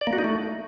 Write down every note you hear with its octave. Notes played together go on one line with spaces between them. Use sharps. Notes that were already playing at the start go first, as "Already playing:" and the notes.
D5
A#3
F#4
D#4
A3